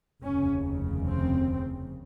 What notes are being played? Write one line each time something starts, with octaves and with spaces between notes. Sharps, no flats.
F1 D#2 C#3 C#4
C4